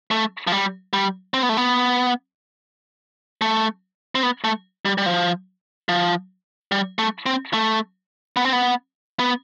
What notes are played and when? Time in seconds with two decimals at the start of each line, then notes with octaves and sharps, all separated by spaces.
0.11 A3
0.47 F3
0.52 G3
0.93 G3
1.34 C4
1.43 B3
1.49 A3
1.57 B3
3.41 A3
4.15 C4
4.23 B3
4.44 A3
4.85 G3
4.98 G3
5.06 F3
5.89 F3
6.72 G3
6.99 A3
7.26 C4
7.53 A3
8.37 B3
8.45 C4
8.53 B3
9.19 B3